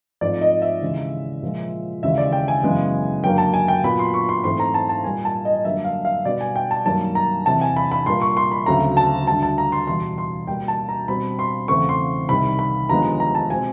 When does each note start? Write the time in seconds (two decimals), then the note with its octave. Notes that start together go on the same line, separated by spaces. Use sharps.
0.21 G#2 F3 A3 C4 D5
0.42 D#5
0.62 E5
0.81 D#2 C#3 E3 G#3
1.42 A#2 F3 G#3
2.03 D#2 C#3 E3 G#3 E5
2.18 D5
2.32 G5
2.48 G#5
2.63 F#2 C#3 E3 G#3 B3
3.24 F#2 D3 F#3 A#3 G5
3.38 A5
3.54 G#5
3.68 G5
3.84 A#2 F#3 B3 B5
3.99 C6
4.14 C#6
4.29 C6
4.44 G#2 E3 A3 C4 C6
4.60 A#5
4.74 A5
4.89 A5
5.04 A#2 G3 A#3 G#5
5.25 A5
5.45 D#5
5.65 F#2 D3 G3 A#3 E5
5.84 F5
6.05 F5
6.25 B2 G3 B3 D5
6.41 G#5
6.56 G5
6.71 A5
6.85 F#2 D#3 G3 A#3 A5
7.15 A#5
7.46 E2 C3 E3 A5
7.62 G#5
7.77 B5
7.92 B5
8.06 A#2 G3 A#3 C6
8.22 C#6
8.37 C6
8.52 B5
8.66 D2 C#3 F#3 A3 C4 A#5
8.97 A5
9.27 D2 D3 G3 A5
9.43 A5
9.58 A#5
9.72 C6
9.87 E2 B2 G3 C6
10.18 C6
10.47 B2 G3 A#3 G5
10.68 A5
10.89 A#5
11.08 B2 G3 C4 B5
11.39 C6
11.68 E2 C#3 E3 A3 C4 C#6
11.89 C6
12.29 C2 C3 D#3 G3 B5
12.59 B5
12.89 D#2 D3 F3 G#3 B3 A#5
13.20 A#5
13.35 A5
13.50 B2 G#3 C4 G#5